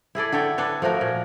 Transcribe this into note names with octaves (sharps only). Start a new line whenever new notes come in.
E4 G#4 A4 D5
D3 A4 C#5 G5
D4 A4 B4 C#5
F3 A3 F#4 A#4
A#2